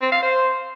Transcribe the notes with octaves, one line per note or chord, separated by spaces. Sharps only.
C4
F5
C5